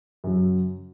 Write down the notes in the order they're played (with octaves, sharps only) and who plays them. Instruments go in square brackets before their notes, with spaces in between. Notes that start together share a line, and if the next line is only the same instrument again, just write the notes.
[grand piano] F#2 C#3 F#3